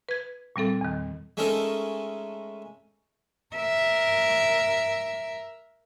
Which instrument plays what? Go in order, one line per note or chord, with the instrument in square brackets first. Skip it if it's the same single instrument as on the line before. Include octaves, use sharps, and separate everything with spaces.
[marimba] B4 G#6
A#2 G3 C4 A4
E2 D#3
[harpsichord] G#3 A3 C#4 D#4 A4 A#4
[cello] A#4 E5